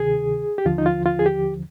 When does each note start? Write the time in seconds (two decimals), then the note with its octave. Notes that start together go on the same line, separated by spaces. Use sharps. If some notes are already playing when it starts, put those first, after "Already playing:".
Already playing: D2 C3 D#3 G#4
0.58 G4
0.65 D#2 D3 F3 F4
0.78 D#4
0.86 F4
1.06 F4
1.19 G#4
1.26 G4